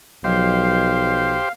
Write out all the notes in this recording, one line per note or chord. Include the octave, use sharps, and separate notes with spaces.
B1 F3 F#3 G4 C5 D#5 F5